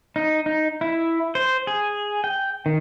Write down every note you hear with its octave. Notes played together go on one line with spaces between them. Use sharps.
D#4
D#4
E4
C5
G#4
G5
D#3